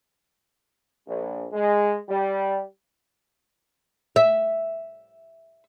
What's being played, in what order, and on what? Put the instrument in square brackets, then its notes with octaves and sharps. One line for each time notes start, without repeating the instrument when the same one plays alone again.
[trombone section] A#1
G#3
G3
[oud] E5